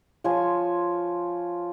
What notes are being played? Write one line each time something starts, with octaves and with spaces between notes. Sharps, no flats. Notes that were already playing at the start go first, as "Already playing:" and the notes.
F3 F4 C#5 G#5